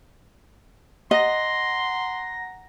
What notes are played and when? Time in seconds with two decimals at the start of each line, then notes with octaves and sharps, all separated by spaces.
1.11 D#5 F#5 A#5 C6 A#6